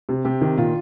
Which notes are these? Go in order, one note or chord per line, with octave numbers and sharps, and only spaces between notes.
C3
C3 G4
D#3
A#2 F4